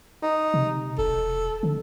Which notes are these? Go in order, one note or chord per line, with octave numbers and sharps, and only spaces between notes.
D#4
C3
E1 A4
D3